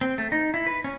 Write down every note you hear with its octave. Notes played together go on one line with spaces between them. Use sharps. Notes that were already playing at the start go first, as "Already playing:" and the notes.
C4
A3
D#4
E4
B4
C#4